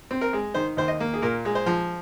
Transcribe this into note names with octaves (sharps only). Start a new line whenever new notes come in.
C4
A#4
G#3
D#3 C5
D#2 C5
D#5
A#3
G#4
A#2 A#4
G#3
C5
F3